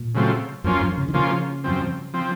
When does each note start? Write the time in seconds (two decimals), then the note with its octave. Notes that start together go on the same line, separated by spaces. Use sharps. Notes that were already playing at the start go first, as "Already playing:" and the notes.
Already playing: A#2
0.15 C#3 F#3 A3 C4 F4
0.64 F#2 F3 A#3 C#4 F4
0.81 F#2
0.98 C#3
1.08 D#3
1.14 C#3 F3 A#3 C#4 F4
1.64 F#2 F3 C4
2.14 F3 C4